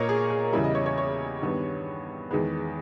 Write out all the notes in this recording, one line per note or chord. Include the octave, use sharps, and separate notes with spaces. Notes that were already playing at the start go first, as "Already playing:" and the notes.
Already playing: A#2 A#3 A#4 C#5 D#5
G#4
G#4
E2 C#3 G3 E4
D#5
C#5
C#5
C#5
G2 D#3 G3 B3
E2 D#3 G#3 B3